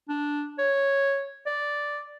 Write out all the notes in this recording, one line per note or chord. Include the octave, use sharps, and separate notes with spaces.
D4
C#5
D5